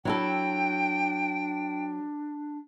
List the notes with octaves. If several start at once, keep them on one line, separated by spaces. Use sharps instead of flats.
F#3 D4 E4 A4 G5